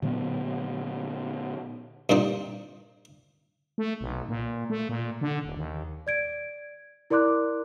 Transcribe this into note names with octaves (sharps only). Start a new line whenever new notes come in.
A#2 D3 F#3 B3
G2 A#2 C4 D#4
A3
B1
A#2
A3
A#2
D3
D#1
D#2
D5 G#6 D7
E4 A#4 D5 C6 D6 F#6